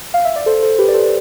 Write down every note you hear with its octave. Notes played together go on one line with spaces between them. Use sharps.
F5
E5
D5
A4 C5
A4 C5
G4 B4
D5
A4 C5